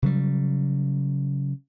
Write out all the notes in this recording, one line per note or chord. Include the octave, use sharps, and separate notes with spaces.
C#3 F#3 G3